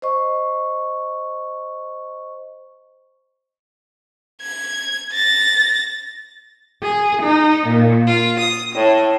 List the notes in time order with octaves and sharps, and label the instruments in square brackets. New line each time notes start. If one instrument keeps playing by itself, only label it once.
[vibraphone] C5 D#5 C#6
[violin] G#6
A6 A#6
[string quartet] G#4
D#4
A#2
F4
D#6
A2